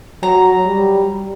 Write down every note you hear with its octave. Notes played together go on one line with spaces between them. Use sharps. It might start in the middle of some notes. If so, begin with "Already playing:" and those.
F#3 A#5
G3